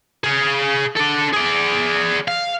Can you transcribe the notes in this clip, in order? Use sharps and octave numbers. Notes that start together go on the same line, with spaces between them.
G#4 F5
D4 A4
G#4 D5
F5